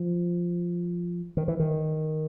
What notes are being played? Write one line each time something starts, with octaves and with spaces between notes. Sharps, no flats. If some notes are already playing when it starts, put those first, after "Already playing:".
Already playing: F3
D#3
E3
D#3